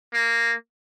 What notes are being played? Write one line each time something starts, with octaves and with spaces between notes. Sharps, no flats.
A#3